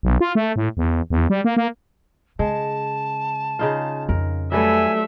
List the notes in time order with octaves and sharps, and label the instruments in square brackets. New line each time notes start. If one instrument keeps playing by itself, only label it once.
[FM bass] B1
F4
A3
A2
E2
E2
G3
A#3
A#3
[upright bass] C#3 [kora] G#3 [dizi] A5
[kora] C#3 D#4 F4
[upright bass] F2 D#3 [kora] A#4
[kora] F#3 G3 B4 [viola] A3 E5 [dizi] G#5